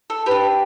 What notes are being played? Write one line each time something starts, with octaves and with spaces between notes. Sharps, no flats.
A4
D4 G4 B4